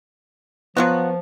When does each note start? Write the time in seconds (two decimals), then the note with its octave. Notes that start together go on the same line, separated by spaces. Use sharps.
0.77 F3 F#3 B3 F4 F#4